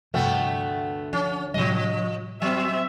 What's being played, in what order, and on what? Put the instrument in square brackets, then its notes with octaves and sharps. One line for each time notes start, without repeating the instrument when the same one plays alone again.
[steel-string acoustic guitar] D2 F#5 G5 [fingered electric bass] G2 C3 F3 [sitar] A3 B3
[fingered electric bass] F3 [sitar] C#4
[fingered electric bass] A2 C3 G3 [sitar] F3 D#5
[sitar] F#3 [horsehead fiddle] C4 E5